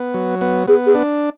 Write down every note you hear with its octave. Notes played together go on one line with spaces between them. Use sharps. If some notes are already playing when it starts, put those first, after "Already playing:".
Already playing: B3
F#3
B3
B3 G#4
G#4
D4